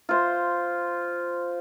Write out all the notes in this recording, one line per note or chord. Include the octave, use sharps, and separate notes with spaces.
F4 C5